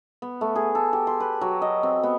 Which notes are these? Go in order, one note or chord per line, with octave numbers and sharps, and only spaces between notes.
B3
A3
G#4
A4
G4
C6
B4
F#3
D#5
C4
B3